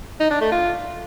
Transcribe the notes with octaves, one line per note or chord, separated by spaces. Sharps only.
D#4
D4
A3
F4